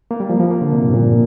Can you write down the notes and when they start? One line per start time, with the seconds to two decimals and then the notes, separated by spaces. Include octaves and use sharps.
0.11 A#3
0.20 G3
0.30 F3
0.40 F3
0.51 A#3
0.61 D3
0.72 C3
0.83 A#2
0.88 G2
0.93 A#2